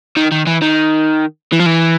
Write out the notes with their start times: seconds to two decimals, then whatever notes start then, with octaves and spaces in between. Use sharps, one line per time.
0.17 D#3
0.32 D#3
0.47 E3
0.62 D#3
1.52 E3
1.59 F3
1.66 E3